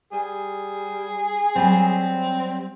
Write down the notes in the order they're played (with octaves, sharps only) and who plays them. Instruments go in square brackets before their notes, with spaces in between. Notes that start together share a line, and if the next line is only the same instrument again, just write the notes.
[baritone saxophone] G3 [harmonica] G#4
[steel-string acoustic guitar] F#3 G3 [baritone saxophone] C4